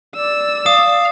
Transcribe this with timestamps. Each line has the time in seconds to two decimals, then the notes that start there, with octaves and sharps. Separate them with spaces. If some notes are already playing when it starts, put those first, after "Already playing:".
0.16 D5 E6
0.66 F5 D#6